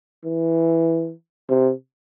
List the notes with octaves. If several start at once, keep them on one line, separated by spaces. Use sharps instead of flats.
E3
C3